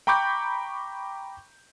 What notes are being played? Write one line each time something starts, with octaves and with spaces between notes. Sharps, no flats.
G5 A#5 B5 C#6 D6 G6